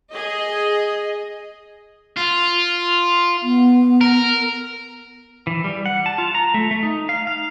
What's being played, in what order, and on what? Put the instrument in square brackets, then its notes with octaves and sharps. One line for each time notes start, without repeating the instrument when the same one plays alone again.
[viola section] G#4 D#5
[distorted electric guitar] F4
[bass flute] B3
[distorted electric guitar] A#4
[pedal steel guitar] E3
G3
F#5
A5
F4
A#5
A3
A3
D#4
F5
F5